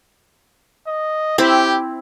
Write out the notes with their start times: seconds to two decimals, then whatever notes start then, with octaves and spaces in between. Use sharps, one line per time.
0.87 D#5
1.38 C4 E4 G4